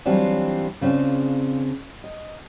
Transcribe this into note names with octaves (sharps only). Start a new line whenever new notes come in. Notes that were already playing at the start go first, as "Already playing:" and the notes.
E3 F#3 G3 C4 D4 F4
C#3 C4 D4 F4 G#4
D#5